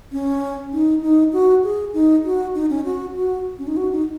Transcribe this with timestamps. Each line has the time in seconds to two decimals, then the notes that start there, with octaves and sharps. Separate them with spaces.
0.12 C#4
0.73 D#4
1.02 D#4
1.33 F#4
1.63 G#4
1.94 D#4
2.25 F#4
2.55 D#4
2.70 C#4
2.85 F#4
3.16 F#4
3.59 C#4
3.67 D#4
3.77 F#4
3.92 D#4